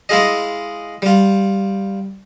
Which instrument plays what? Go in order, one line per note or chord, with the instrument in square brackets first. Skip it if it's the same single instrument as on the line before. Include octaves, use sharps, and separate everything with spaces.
[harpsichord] G#3 E4 F4 G#4 D#5
G3 F4